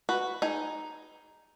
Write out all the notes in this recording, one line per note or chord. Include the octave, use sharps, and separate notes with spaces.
F#4 B4
D#4 G#4